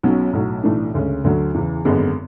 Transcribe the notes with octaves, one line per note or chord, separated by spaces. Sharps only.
B1 B2 F#3 C#4
B1 A2 F#3
B1 A2 E3 A3 D4
D2 C#3 G#3 C#4
D2 D3 F#3
E2 C#3 E3
G#1 F#2 D3 G#3 B3